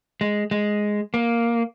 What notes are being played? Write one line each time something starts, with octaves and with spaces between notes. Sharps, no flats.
G#3
G#3
A#3